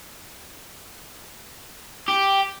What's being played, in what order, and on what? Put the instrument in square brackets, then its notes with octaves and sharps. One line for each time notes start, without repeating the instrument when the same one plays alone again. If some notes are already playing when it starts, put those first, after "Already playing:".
[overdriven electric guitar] G4